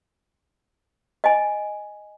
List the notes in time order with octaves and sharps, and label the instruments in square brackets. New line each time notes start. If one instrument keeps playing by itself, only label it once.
[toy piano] D#5 G#5